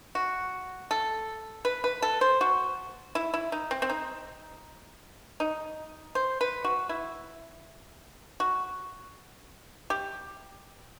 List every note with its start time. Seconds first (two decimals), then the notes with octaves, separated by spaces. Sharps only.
0.15 F#4
0.91 A4
1.65 B4
1.84 B4
2.02 A4
2.21 C5
2.41 F#4
3.15 E4
3.34 E4
3.52 D#4
3.71 C4
3.82 C4
3.90 D#4
5.40 D#4
6.15 C5
6.41 B4
6.64 F#4
6.89 E4
8.40 F#4
9.90 G4